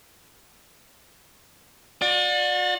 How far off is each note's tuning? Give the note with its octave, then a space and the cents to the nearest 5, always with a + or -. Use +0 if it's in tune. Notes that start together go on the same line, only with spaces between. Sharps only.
F#4 -40 D5 +15